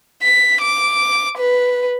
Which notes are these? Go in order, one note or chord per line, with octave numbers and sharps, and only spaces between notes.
B6
D6
B4